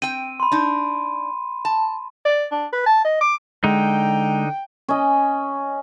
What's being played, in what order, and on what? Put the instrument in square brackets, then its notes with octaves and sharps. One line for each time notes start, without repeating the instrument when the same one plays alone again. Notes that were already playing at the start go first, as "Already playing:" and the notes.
[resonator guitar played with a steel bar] C4 G5 [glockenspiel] D#7
[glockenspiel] B5 C6
[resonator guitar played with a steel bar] D4 D#4
A5
[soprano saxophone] D5
D4
B4
A5
D#5
D6
[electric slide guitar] D3 D#4 [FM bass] G#3 [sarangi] G5
[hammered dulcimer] C#4 D#5